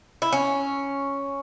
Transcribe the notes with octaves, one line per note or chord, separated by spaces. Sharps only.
E4
C#4